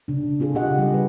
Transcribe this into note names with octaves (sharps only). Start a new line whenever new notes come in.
C#3 D4
C4 F4 G#4 A4
C#3 G4 D#5 F#5
G3 G#4 D#5
B4